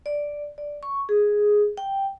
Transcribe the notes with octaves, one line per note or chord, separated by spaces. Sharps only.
D5
D5
C#6
G#4
G5